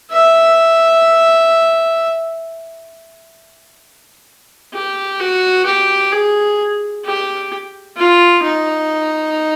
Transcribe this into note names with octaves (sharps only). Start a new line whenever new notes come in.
E5
G4
F#4
G4
G#4
G4
F4
D#4